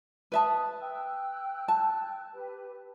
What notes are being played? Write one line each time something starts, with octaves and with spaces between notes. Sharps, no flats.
B4 E5 A5 B5 D#6
G5 E6 F#6
A5
G4 B4